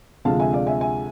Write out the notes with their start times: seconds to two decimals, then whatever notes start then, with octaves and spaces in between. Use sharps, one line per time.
0.25 D2 C3 F3 G#3 F5 A5
0.40 E5 G#5
0.53 D5 F5
0.67 E5 G#5
0.81 E5 G#5